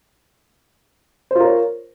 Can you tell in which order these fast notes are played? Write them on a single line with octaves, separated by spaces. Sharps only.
C5 F4 A#4 C#5